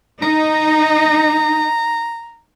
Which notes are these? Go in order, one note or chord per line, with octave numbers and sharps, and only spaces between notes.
D#4 A#5